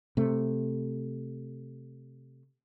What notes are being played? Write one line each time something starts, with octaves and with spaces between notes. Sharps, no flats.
C3 A3